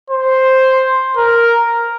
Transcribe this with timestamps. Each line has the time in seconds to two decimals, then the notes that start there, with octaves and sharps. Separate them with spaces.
0.10 C5
1.17 A#4